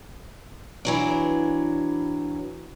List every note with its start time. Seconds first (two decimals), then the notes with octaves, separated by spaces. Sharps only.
0.85 E3 F#3 D4